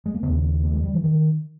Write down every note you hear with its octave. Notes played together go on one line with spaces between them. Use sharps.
G#3
A#3
D#2 C#3 B3
A#3
G#3
G3
E3
D#3